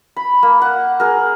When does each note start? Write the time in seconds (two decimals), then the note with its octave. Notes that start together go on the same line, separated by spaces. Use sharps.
0.16 B5
0.43 A#3
0.62 F#5
1.00 G#4 A#4